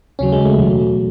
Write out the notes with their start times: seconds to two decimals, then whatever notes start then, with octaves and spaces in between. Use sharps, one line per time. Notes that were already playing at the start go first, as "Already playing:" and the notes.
0.19 D#2 C#3 F#3 C#4
0.32 G#3
0.45 A3
0.58 E2 B2 F#3